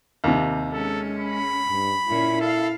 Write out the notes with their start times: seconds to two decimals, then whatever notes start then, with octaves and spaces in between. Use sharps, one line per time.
0.24 D#2 C3
0.72 G#3 C#4 A4
1.18 B5
1.69 G2
2.08 A#2 C#4 E4
2.40 A4 F5